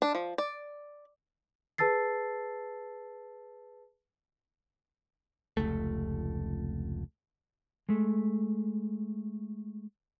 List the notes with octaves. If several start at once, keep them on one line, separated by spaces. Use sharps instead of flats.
D4
F3
D5
G#4 B4 A5 E6 A6 C7
F1 C#2 A3
G#3 A3